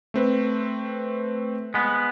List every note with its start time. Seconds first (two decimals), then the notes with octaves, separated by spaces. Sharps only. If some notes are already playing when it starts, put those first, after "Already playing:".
0.14 A3 C4 B4
1.74 G#3 B3